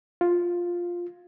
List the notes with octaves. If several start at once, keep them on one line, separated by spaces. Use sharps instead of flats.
F4